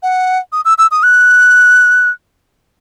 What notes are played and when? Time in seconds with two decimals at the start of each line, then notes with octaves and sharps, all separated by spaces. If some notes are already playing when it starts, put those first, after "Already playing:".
0.03 F#5
0.52 D#6
0.65 E6
0.78 E6
0.91 D#6
1.03 F#6